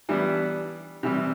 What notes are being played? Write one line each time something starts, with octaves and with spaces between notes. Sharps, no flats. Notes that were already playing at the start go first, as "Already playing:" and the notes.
E3 G3 B3 D4
C3 E3 G3